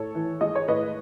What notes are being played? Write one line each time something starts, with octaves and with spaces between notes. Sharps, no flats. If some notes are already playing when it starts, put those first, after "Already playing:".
Already playing: A2 A4 C#5
E3
G#3 D#5
C#5
A2 B4 D#5